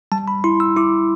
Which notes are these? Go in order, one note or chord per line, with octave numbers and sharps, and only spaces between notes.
G3 A5
B5
E4 C6
E6
E4 D6